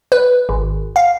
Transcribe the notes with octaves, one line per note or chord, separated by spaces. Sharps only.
B4
G#1
F5